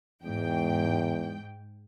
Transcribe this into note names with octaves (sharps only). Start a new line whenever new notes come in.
E2 G#2 G5